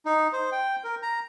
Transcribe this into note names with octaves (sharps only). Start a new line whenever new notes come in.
D#4
C5
G5
A#4
A#5